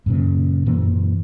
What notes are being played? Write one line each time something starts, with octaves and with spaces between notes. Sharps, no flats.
F#2 A#2 C#3
F#2 A#2 E3 A#3